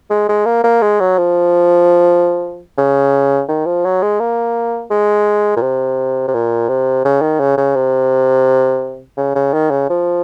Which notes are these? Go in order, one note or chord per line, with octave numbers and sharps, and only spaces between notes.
G#3
G#3
A#3
A#3
G#3
F#3
F3
C#3
D#3
F3
F#3
G#3
A#3
G#3
A#2
C3
C3
A#2
C3
C#3
D#3
C#3
C#3
C3
C#3
C#3
D#3
C#3
F3